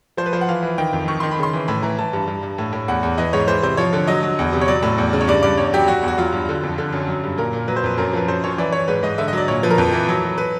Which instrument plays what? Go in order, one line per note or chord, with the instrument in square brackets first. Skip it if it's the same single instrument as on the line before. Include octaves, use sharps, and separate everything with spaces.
[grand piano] F3 C5
B4
F3 C5
F#5
E3 F5
E3
D#3 G5
F2
D#3 C#6
D#3 C6
B5
C#3 C6
E3
A2 B5
E3 A#5
E3 A5
G2
G2
G2
A2
A2
E2 F#5
E2
E3 D#5
G#2 C#5
E3 C5
C3 C5
F3 C#5
D3
F#3 D#5
F#3
E2
C3
C#5
F#3 D5
A2
E2
C#3
C#5
G2 D5
G2 D5
E2 C#5
F#3 G4
F#3 F#4
E2
F#4
F#3 F4
G2
D3
F2
D3
F#2
F#3
G2
A#2 A#4
A#2
F#3 B4
C5
F2 B4
F#2 A#4
F3 B4
F#2 C5
F#2 C#5
E3 D5
E3 C#5
G#2 B4
G#2 D#5
D3 E5
D#5
F#3 D5
A#2 C#5
F3 B4
A#4
F2 B4
E3
F#3
F#3
B4